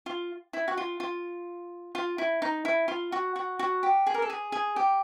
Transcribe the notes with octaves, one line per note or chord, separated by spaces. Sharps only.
F4
E4
F#4
F4
F4
F4
E4
D#4
E4
F4
F#4
F#4
F#4
G4
G#4
A#4
A4
G#4
G#4
G4